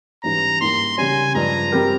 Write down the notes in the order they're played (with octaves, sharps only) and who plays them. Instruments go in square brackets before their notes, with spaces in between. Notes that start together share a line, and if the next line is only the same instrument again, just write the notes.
[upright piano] G#2 E3 G3 C#4 [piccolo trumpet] A#5
[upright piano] G#2 G3 A#3 E4 G4 [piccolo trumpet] C6
[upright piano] C#3 G3 C#4 [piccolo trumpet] G#5
[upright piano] G2 F3 G#3 [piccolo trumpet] A#5
[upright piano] G3 C4 G4 A#4